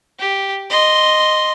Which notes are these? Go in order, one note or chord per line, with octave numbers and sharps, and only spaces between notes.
G4
D#5 C6